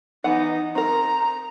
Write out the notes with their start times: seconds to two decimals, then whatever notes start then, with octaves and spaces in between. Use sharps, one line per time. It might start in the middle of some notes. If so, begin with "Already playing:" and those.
0.24 E3 B3 D#4 F#5
0.75 C4 A#4 A#5